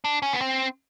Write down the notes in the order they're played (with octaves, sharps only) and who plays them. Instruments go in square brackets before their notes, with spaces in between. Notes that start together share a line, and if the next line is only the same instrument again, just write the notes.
[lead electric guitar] D4
C#4
B3
C4